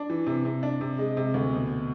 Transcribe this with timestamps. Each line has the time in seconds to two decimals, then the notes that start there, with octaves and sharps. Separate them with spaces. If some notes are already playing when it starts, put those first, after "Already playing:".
Already playing: D4
0.10 E3
0.27 C3
0.45 C3
0.63 D4
0.81 C3
0.99 G#3
1.17 C3
1.34 D2
1.52 B2